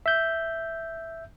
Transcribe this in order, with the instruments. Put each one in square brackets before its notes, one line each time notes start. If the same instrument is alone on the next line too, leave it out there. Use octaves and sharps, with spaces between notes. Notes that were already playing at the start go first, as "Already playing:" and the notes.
[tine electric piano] E5 G6